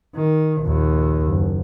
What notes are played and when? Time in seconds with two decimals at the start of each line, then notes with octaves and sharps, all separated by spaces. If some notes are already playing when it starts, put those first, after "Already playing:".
0.15 D#3
0.62 A#1 D#2
1.27 F#1